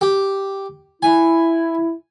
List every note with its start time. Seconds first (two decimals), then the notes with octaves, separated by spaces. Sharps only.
0.01 G4
1.03 E4 G#5